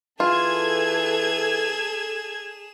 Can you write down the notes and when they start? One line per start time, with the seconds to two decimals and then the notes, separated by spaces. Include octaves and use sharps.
0.20 E3 F4 G#4 A4 G#6 E7